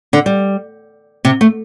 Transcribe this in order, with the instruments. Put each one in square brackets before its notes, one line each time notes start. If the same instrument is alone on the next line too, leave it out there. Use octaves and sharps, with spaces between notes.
[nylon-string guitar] D3
G3
C3
A3